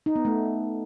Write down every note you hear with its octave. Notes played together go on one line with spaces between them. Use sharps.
D#4
B3
A3